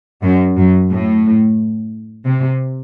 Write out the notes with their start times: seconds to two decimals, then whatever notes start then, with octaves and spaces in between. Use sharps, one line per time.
0.23 F#2
0.57 F#2
0.90 A2
2.25 C3